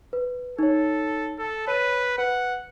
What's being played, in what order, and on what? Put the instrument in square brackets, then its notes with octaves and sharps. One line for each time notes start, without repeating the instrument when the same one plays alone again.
[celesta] B4
[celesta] D#4 C#5 [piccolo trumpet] A4
[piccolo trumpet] A4
[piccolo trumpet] B4 [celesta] C#5 D#7
[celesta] B4 [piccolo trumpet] F#5